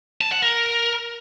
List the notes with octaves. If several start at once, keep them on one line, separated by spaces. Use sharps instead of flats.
A5
F#5
A#4